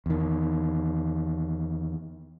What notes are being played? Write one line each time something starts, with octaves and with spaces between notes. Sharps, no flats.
E2 D#3